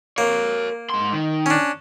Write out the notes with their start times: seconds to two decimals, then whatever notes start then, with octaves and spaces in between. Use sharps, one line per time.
0.18 A#3 A#4 C#5
0.90 G#2 C6
1.13 D#3
1.46 C#4 D4